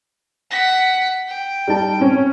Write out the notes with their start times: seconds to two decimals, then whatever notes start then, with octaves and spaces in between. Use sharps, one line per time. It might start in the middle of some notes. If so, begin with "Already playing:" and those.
0.51 F#5 B6
1.28 G5
1.67 G3 D#4 A5
2.00 C4 C#4